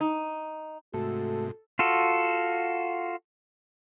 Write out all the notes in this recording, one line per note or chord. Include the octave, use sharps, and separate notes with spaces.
D#4
G#2 C3 A3 F#4 A4
F4 F#4 A4